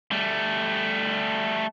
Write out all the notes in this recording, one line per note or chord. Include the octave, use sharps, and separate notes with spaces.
G3 A3